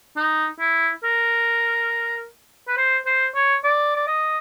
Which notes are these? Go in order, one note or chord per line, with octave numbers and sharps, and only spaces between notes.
D#4
E4
A#4
B4
C5
C5
C#5
D5
D5
D#5